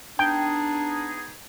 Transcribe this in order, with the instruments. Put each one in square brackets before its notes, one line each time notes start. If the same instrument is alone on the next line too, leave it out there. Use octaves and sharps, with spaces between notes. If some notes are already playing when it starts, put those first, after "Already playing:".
[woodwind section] B3 D#4 G#4 [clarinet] D4 [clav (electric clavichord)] G5